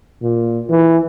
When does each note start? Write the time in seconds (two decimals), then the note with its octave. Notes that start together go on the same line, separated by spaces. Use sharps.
0.22 A#2
0.70 E3